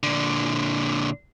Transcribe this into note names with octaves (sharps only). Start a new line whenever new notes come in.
A#2 D3